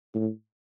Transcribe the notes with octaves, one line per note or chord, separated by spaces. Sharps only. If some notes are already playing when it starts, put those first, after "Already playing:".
A2